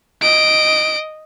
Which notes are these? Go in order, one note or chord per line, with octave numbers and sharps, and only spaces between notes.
D#5 D7